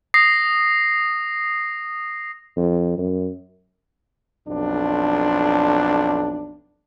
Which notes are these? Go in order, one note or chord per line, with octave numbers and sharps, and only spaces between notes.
D#6 A#6 C7
F2
F#2
B1 F2 D4